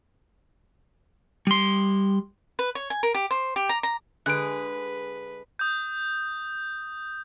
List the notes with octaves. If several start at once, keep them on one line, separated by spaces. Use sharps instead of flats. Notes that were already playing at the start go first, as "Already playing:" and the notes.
G3 C6
B4
C#5
G#5
A#4
G4
C5
G4
A#5
A#5
D3 G#3 G#4 B4 F#6 D7
D#6 G6